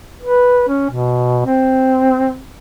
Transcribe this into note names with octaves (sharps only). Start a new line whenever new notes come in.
B4
C#4
B2
C4